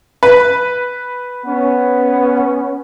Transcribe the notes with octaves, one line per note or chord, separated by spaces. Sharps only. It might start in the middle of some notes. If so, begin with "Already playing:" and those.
B4
B3 C#4